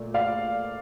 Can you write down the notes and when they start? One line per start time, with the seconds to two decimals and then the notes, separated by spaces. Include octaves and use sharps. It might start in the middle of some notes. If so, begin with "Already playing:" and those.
Already playing: A#2 A3
0.14 D5 F5